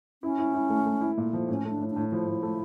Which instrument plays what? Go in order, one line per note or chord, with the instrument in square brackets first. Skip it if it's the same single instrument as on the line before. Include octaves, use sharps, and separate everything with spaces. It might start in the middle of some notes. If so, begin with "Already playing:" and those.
[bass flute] C#4 [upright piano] E4
[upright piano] E4
E4
A3
A3
E4
A#2
F3
[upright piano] A2 [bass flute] C#4
[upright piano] A3
[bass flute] D4
[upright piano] A2
[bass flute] D4
[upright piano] A2
[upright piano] F3 [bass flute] E4
[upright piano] A2
A3